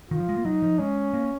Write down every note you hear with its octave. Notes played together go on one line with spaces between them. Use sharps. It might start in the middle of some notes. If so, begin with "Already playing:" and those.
D#3 F4
F3
G#3
A#3
F#3 D#4
F3
G#3 C#4
A#3